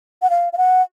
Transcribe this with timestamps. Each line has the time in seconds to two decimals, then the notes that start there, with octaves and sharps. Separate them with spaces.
0.22 F#5
0.30 F5
0.53 F5
0.58 F#5